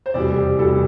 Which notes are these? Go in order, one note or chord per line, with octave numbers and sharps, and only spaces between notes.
C5
F1 E2 B2 G3 D5
G4
F1 E2 B2 G3 A4